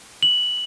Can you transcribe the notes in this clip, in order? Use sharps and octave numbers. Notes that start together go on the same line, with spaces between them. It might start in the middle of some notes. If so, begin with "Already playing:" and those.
F#7